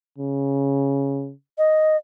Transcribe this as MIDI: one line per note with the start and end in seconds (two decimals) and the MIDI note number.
0.18 1.32 49
1.58 1.97 75